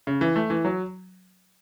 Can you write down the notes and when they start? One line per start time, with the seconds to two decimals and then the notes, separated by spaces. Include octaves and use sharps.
0.07 C#3
0.21 E3
0.36 A3
0.50 E3
0.65 F#3